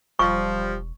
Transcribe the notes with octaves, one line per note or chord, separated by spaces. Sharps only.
E1 F3 G3 C#6